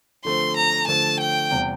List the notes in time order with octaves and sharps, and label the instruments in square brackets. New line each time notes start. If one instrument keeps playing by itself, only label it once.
[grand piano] D3 F3 A3 C4 [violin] C6
[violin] A#5
[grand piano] D3 F3 A3 C4 [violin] A5
[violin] G5
[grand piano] E2 C3 G3